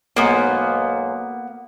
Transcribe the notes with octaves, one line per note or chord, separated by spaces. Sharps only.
B1 G#2 A#3 B3